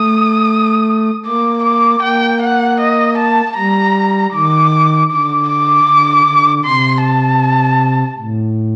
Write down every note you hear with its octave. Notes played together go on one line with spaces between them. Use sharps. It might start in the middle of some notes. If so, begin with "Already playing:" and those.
Already playing: A3 D#6
A#3 D6
D6
A#3 G5
F#5
D#5
A5
G3 A#5
D#3 D6
D3 D6
D6
D3
D3
C3 C6
A5
A2